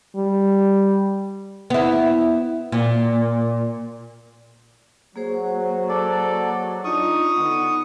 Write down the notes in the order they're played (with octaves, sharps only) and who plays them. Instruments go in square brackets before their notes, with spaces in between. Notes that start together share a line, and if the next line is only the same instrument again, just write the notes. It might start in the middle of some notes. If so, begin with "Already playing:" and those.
[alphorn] G3
[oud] B3 E4
A#2
[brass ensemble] F#3 [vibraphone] A#3 G#4 C5
[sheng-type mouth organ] A4 D5
[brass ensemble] D4 D#4 [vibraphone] F4 [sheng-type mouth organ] C#6 D#6
[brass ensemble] D3 B3 [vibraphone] D#4